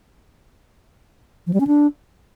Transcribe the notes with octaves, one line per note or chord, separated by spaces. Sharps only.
F3
G3
C#4
D4